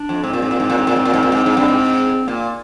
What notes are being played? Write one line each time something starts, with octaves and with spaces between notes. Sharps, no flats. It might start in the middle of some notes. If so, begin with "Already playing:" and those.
Already playing: D4
F2
G#2 C4
A#2
G#2
A#2
G#2
A#2
G#2
A#2
G#2
A#2
G#2
A#2
G#2
G#2
G2
G#2
A#2 A#3